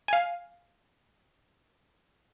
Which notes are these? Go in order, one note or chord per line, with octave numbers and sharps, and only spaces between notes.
F5 G#5